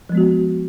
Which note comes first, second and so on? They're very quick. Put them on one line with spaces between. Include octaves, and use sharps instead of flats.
F3 G#3 B3 F#4